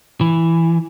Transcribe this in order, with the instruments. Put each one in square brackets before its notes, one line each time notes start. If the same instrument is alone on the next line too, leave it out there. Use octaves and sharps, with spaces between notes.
[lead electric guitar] E3